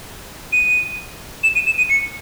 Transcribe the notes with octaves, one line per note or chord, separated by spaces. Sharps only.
D#7
E7
D#7
E7
D#7
C#7